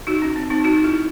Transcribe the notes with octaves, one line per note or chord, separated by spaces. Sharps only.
D#4 F#4
C#4
C4
C4 D#4
D#4 F#4
E4 G#4